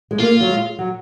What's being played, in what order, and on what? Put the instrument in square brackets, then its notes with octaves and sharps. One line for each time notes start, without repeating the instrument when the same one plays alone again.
[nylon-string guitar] G#3
[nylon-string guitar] A#3 [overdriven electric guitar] F4
[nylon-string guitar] F#3
G#3
F#3